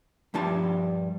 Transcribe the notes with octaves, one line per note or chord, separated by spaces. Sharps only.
G2 F3 G3 D4 A5